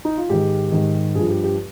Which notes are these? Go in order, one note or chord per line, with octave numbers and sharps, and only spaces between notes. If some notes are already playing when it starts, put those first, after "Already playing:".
D#4
F4
G#2 D#3 G4
G#2 D#3
G2 F3 G#4
G4
G4